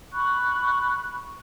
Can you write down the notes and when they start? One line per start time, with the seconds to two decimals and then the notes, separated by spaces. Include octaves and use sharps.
0.13 B5 C#6 F#6